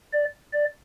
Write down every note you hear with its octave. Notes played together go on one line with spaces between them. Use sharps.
D5
D5